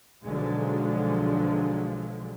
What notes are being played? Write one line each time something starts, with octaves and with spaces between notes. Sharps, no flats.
B1 D3 F3 F#3 G#3